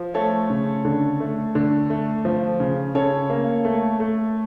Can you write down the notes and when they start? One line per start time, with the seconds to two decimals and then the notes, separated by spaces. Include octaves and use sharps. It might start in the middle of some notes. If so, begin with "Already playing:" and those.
Already playing: F3
0.14 A3 A4 C#5
0.50 C#3
0.85 D3
1.20 A3
1.55 D3
1.90 A3
2.25 F3
2.60 C#3
2.95 C#3 A4 C#5
3.30 A#3
3.65 A3
4.00 A3